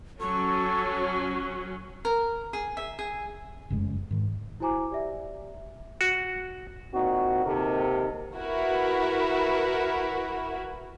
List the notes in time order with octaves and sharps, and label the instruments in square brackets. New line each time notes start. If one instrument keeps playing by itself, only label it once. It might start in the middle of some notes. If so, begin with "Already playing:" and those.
[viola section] F#3 C#4 [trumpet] A4 [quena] C#6
[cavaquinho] A#4
G#4
E5
G#4
[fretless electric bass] F1 F#2 C#3 G#3
G#2 D#3
[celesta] E4 F#4 C5 G#5 A#5 D6
G4 D5 E5
[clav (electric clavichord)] F#4
[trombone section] A#2 C4 D#4 F#4
D#2 C3 D#4 A4 A#4
[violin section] E4 F#4 A#4 B4